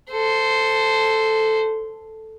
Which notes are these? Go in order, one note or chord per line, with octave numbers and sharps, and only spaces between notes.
A4 C5